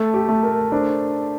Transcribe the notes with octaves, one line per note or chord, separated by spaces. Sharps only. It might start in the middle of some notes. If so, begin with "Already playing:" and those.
Already playing: A3 A4
G4
A3
A#4
D4 C5